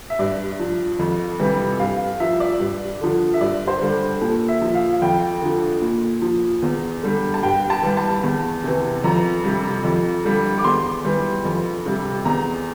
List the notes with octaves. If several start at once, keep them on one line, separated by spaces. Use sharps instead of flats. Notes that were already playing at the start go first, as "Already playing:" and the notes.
E5
G2 D5
F3
F2
C3 E3 G3
G2 F5
F3 E5
D5
G2
D3 F3
E5
G2 D5
C5
D3 G3
A#2 A4
E5
F3
F5
F2 G5
D3 F3
A#2
F3
E2
D3 G3
A5
G2 G5
A5
E3 G3
A5
E2
C3 E3
F2 A#5
C3 G3
F2
D3 G3
D6
E2 C6
E3 G3
F2
C3 G3
E2 A#5